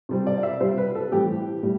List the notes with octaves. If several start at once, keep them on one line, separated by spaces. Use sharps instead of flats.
C3 G3 C4
D5
D5
E5
C3 G3 C4 C5
B4
A4
A2 E3 G3 C4 G4
A2 G3